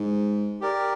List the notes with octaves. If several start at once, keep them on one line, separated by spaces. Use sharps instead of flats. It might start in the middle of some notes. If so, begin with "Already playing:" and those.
Already playing: G#2
G4 A#4 D5